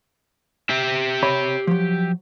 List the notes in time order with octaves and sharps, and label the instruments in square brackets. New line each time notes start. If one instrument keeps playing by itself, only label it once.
[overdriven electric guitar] G4 E5
[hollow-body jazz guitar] C3 C#5 B5
F3 F#3